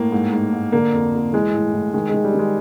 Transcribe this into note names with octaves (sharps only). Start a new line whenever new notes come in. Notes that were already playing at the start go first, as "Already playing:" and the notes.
Already playing: A2 A#3
G#2
G#2
G#2
D3 A#3
F2
F2
E3 G#3
A2
A2
D#3 G#3
D#3 G#3
G3
D#3 G#3